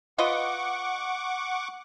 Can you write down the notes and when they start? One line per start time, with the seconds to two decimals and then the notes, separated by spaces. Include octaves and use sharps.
0.18 F4 B4 D#5 F#5 C#6 D6